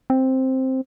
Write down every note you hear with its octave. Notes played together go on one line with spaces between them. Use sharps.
C4